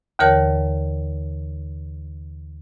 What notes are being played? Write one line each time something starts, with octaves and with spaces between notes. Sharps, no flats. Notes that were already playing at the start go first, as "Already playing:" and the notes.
D#2 D3 E3 A#4 C#5 A5